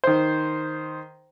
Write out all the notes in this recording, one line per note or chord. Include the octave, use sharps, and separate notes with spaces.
D#3 C5